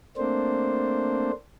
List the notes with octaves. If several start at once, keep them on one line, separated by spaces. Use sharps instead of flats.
A3 A#3 C4 D4 C5